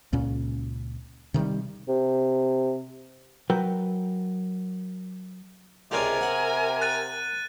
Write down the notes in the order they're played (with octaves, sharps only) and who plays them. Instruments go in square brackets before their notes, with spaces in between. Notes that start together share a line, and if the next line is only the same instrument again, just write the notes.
[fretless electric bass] C#2 A#2 C#4
C3 D#3 F3 G3
[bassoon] C3
[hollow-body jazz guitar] F#3 F#4 A#4 B4 G5
[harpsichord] C#2 D4 F4 [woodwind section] C3 [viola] A#4 G#5
[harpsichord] F#5
[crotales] F#6 A6 D#7